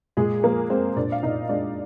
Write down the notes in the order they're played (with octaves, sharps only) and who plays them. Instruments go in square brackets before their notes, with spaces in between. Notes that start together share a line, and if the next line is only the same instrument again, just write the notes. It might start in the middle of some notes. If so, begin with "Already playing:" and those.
[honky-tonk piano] A#2 G#3 G#4
F3 A#3 A#4
G#3 C4 C5
A#2 D4 D5
F5
A#2 D#4 D#5
G#3 D4 D5